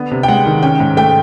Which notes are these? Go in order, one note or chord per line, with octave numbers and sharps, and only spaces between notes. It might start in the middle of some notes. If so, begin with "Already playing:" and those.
Already playing: D3 B3
C3
G5
G#3 F#5
D#3
C#4 G5
G#2
A3 G5